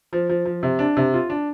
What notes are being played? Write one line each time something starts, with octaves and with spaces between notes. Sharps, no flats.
F3
F3
F3
C3
D4
C3
F4
D4